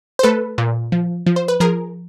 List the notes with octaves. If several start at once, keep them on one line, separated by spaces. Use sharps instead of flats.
C5
A3 A4 B4
A#2
F3
F3
C5
B4
F3 G#4 A#4